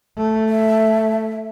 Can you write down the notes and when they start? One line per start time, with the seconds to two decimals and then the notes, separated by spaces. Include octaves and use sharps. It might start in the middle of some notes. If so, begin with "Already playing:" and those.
0.17 A3
0.49 E5